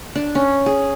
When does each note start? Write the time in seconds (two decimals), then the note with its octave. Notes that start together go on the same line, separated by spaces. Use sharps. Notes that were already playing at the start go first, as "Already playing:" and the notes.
0.15 D4
0.35 C#4
0.66 G#4